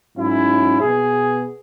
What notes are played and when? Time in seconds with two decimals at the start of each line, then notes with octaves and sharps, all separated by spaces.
0.17 G#2 F#3 C#4 E4
0.81 B2 B3 G#4